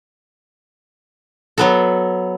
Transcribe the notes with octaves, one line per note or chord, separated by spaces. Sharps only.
F#3 B3 A4